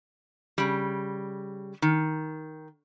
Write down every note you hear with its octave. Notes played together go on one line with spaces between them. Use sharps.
C#3 G3
D#3